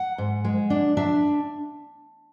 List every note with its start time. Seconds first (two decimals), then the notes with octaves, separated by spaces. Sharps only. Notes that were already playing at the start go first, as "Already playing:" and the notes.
Already playing: F#5
0.18 G#2
0.45 G#3
0.70 D4
0.97 D4 E5